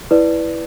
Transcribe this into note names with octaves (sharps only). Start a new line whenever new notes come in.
E4 B4 D5